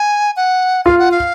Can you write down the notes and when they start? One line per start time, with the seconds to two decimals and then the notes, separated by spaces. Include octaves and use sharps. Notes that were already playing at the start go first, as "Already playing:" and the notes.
Already playing: G#5
0.36 F#5
0.85 F4 F5
0.99 F#5
1.11 F5